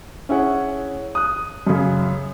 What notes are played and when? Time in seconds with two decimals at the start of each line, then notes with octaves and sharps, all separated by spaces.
0.29 C#4 E4 G#4 F#5
1.15 D#6 F#6
1.67 F#2 C#3